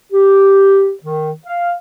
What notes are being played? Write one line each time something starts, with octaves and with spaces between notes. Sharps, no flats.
G4
D#3
F5